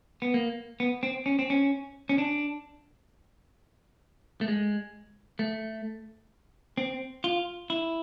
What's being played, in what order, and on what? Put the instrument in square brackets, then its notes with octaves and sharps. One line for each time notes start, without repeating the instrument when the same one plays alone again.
[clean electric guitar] B3
A#3
B3
C4
C#4
C4
C#4
C#4
D4
A3
G#3
A3
C4
F4
E4